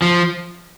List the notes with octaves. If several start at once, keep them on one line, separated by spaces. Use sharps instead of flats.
F3